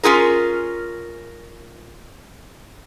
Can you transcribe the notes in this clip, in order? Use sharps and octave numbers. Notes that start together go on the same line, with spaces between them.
C#4 F4 G#4 A#4